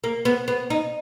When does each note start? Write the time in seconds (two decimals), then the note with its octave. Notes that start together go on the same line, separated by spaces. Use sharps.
0.04 A#3
0.25 B3
0.48 B3
0.70 D#4